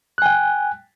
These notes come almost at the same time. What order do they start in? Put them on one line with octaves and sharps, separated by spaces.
F#6 G#5 G5